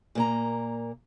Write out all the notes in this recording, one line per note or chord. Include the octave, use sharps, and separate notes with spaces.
A#2 A#3 A#5